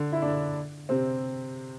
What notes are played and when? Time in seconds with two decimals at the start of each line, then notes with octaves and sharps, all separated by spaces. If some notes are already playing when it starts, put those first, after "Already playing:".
Already playing: D3
0.12 E4
0.22 D3 D4
0.89 C3 C4